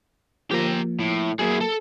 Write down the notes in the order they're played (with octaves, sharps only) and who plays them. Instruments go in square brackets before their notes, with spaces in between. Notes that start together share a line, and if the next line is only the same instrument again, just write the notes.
[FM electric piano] F3 A#3 [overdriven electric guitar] G4 A#5
[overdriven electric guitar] A2
[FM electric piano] F#3 A#3 [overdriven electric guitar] E4 G#4
[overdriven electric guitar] A4